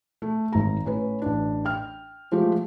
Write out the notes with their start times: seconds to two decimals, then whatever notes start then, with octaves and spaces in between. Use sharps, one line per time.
0.22 A3
0.53 G#1 A#5
0.85 A2 C#4 B4
1.22 A1 D4
1.65 G5 F6
2.32 F3 G#3 A3 F4 G4